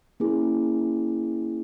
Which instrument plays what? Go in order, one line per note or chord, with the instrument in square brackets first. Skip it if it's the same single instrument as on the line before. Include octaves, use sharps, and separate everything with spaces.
[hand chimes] A#3 C#4 E4 G#4